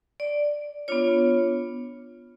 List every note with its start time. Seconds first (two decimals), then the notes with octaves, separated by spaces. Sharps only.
0.20 D5
0.88 B3 D4 F4 C#5